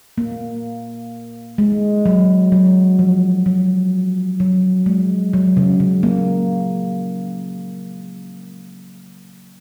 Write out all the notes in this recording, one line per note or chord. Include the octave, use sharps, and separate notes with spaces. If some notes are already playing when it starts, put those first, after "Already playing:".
A#3
G#3
F#3
F#3
F3
F#3
F#3
G#3
F#3
C#3
C#3
A#3